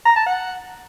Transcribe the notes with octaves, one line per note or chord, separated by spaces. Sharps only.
A#5
A5
F#5